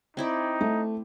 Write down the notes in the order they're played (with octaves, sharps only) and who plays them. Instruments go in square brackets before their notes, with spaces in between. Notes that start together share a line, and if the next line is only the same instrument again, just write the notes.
[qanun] C4 E4 D5 [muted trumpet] D#4
[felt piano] A3